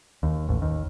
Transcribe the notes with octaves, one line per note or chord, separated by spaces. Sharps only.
D#2
A1
D#2